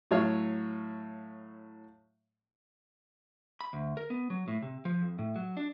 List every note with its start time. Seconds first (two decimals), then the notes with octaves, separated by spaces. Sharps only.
0.11 A2 F#3 C#5 F5
3.61 B5
3.73 D2
3.97 A#4
4.10 B3
4.30 F#3
4.48 A2
4.62 C3
4.85 F3
5.02 F2
5.19 A2
5.36 F#3
5.57 D4